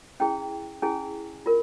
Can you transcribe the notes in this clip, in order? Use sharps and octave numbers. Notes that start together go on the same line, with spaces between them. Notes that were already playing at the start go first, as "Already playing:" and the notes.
C#4 E4 G#4 G5
C#4 E4 G#4 G#5
F4 A#4